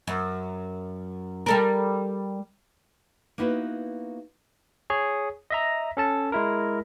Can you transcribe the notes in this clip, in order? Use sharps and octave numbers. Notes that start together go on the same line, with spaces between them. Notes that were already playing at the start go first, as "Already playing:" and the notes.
F#2
G3 A4 A#4
A#3 B3 D#4 E4 F#4 B4
G#4 C#5
D#5 E5 A#5
C#4 A4 A5
G#3 E4 A#4